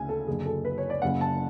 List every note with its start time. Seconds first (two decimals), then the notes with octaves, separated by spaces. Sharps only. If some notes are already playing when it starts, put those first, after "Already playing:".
Already playing: D2 C#3 G#5
0.09 A4
0.27 F#1 F#2 D3 G#4
0.46 A4
0.65 B4
0.78 C#5
0.90 D5
1.02 F#1 F#2 C#3 F#5
1.21 A5